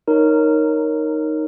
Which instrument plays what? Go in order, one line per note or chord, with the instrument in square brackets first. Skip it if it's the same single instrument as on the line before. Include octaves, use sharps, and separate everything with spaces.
[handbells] D#4 A#4 C#5